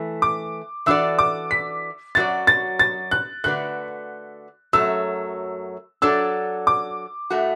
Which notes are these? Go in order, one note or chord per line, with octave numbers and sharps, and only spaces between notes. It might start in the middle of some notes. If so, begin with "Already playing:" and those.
Already playing: E3 A3
D6
E3 D4 F#4 A4 D5 E6
D6
B6
F#2 F#3 B3 F#4 D5 A6
A6
A6
F#6
D3 A3 F#4 B4 D5 F#6
F#2 F#3 A3 E6
F#3 D4 A4 D5 E6
D6
A2 A3 F#4